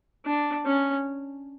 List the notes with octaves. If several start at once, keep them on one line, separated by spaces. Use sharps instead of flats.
D4
C#4